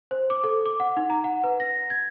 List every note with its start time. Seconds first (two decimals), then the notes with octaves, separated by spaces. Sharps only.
0.11 C5
0.30 D6
0.44 A4
0.66 D6
0.80 F#5
0.97 D#4
1.10 A#5
1.24 F#5
1.44 B4
1.60 A#6
1.90 G#6